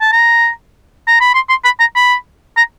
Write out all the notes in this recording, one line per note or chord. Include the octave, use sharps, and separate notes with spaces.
A5
A#5
A#5
B5
C6
C6
B5
A#5
B5
A#5